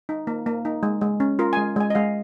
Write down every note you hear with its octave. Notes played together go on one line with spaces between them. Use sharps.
D#4
A#3
A#3
D#4
G#3
G#3
C#4
F4 A#4
G#3 G#5
G#3 G#5
D#5
G#3 F5